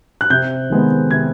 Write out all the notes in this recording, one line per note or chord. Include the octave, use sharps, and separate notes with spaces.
F#6
C3 G6
D#3 G#3 B3
C3 G#6